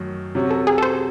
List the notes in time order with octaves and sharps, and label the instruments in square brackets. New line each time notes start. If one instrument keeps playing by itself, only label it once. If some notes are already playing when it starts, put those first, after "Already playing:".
Already playing: [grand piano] F#2 D#3 A3
C3 F#3 C#4
[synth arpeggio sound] A4
G#4
A4
C5